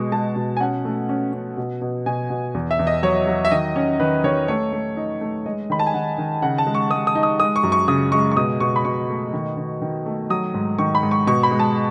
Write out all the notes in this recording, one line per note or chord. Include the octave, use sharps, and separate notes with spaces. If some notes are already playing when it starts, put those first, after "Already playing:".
Already playing: B2 G#3
G#3 A5
B2
G#5
C#4 F#5
A3
C#4
C#4
B2
B2
B2 G#5
B2
E2
E5
E2
D#5
F#3 C#5
F#3
E5
D#3 D#5
C#4
D#3 B4
D#3 C#5
A3 C#5
A3
D#4
A3
G#3 D#5
D#3 B5
A5
G#5
D#3 F#5
D#3
C#3 F#5
A5
G#3
C#6
G#3 D#6
D#6
D#4
D#6
G#3 D#6
C#6
F#2
C#6
C#3 D#6
G#3 C#6
C#6
B2 D#6
B2 C#6
B5
B2 C#6
A3
D#3
D#3
D#3
A3
F#3 D#6
G#2
D#3 C#6
B5
G#2
C#6
B2 C#6
B5
G#3
A5